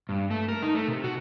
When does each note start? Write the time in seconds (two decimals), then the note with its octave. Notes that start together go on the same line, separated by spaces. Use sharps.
0.09 G2
0.31 A3
0.48 A#4
0.62 D#4
0.75 A3
0.88 C3
1.04 F#4